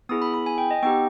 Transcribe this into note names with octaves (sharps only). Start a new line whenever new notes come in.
B3 E4 G#4 D#6
B5
B5
G#5
G5
D#5
B3 D#4 G4 G5